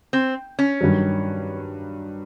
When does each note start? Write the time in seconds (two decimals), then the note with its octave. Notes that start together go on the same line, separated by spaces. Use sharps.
0.13 C4
0.59 C#4
0.81 G2 D#3 F#3